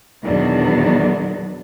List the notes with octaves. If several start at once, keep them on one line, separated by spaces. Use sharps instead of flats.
E2 B2 D#3 F#3 B3 D4